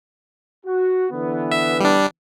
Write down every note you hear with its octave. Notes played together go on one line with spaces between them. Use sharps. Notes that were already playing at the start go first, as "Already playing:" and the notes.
F#4
D3 E3 B3
E5
G3 D4